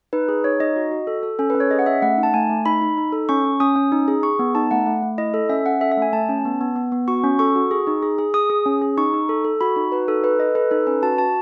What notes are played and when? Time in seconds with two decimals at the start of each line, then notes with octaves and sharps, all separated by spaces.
0.13 D#4 B4
0.29 G#4
0.44 D#4 C#5
0.60 D#4 D#5
0.76 F#4
0.91 F#4
1.07 A4
1.23 A4
1.39 C#4 A4
1.50 B4
1.55 C#4
1.60 C#5
1.71 G#4 D#5
1.79 F#5
1.86 C#4 E5
2.02 A3 F#5
2.18 D#4
2.23 A5
2.34 A3 G#5
2.50 A3
2.65 D#4 B5
2.82 D#4
2.97 D#4
3.13 A4
3.29 C#4 C#6
3.45 C#4
3.60 C#4 D#6
3.76 C#4
3.92 D#4
4.08 G#4
4.23 G#4 C#6
4.39 B3
4.55 D#4 A5
4.71 A3 F#5
4.87 A3
5.03 A3
5.18 E4 D#5
5.34 A4
5.49 C#4 E5
5.65 C#4 F#5
5.81 A4 E5
5.92 E5
5.97 A3
6.02 G#5
6.13 A3 A5
6.29 C#4
6.45 B3
6.61 B3
6.76 B3
6.92 B3
7.08 F#4 C#6
7.24 C#4
7.39 A4 C#6
7.55 F#4
7.71 G#4
7.87 D#4
8.03 G#4
8.18 G#4
8.34 G#4 D#6
8.50 G#4
8.66 C#4
8.82 G#4
8.97 D#4 C#6
9.14 D#4
9.29 A4
9.45 A4
9.61 F#4 B5
9.76 D#4
9.92 F#4 B4
10.08 D#4 A4
10.24 A4 B4
10.39 A4 D#5
10.55 A4 B4
10.71 D#4 A4
10.87 C#4 B4
11.03 F#4 A5
11.18 F#4 A5